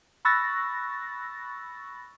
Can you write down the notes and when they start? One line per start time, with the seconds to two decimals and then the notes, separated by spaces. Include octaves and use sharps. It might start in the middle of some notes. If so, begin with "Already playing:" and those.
0.25 B5 C#6 E6 F#6 A6 A#6